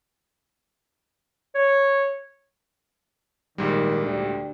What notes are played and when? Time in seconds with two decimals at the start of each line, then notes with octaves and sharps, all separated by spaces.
1.55 C#5
3.58 A#1 G#2 D#3 G3
4.04 D2 D4 G4